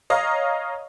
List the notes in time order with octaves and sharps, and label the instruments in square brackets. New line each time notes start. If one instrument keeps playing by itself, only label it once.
[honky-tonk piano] C#5 D#5 F5 A#5